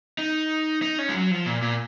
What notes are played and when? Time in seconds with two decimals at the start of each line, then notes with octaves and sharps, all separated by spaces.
0.18 D#4
0.82 D#4
0.99 C#4
1.09 G#3
1.14 F#3
1.31 F3
1.46 A#2
1.62 A#2